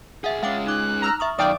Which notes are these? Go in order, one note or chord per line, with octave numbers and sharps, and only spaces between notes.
B1 G#4 E5 F#5
G#3 C#4 F5 G5 D6 A6
D#4 D6 F#6 G#6
A#5 E6 F6
E5 C#6 D#6
F#2 D#3 D5 F5 G5 D6 D#6